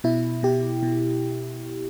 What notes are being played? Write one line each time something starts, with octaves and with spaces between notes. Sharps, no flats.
B2 E4
B2 G4
B2